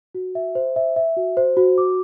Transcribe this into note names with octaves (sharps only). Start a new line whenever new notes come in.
F#4
E5
C5
E5
E5
F#4
C5
F#4
D6